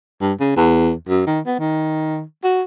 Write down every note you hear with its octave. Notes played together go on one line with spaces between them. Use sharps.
G2
C#3
E2
F#2
D#3
B3
D#3
F#4